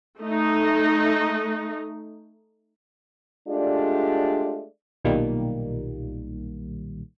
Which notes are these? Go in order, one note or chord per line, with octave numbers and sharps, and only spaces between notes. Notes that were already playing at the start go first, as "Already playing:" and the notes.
A3 D#4
G#3 A3 D4 F4 G4 D5
B1 A#2 D#3 G3 A#3